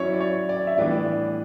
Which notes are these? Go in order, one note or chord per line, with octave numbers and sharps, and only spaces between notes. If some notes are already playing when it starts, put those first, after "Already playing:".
Already playing: F#3 C#4 E4 C#5 D5
D5
C#5
D5
E5
A2 E3 G3 B3 D4 D5
D5